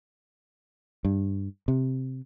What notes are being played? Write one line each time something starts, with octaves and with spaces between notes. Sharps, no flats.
G2
C3